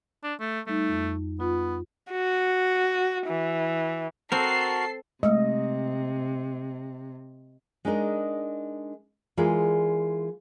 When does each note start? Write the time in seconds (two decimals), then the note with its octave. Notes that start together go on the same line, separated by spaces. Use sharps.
0.24 D4
0.40 A3
0.67 G3 A3 D#4
0.89 F2
1.40 B3 F4
2.12 F#4
3.27 E3
4.32 C4 F#4 A4 A#4 A5 C7
5.23 C3 G#3 A3 D#5
7.85 G#3 D4 D#4 A#4 D#5
9.37 E3 G#3 F4 G#4 A#4 D5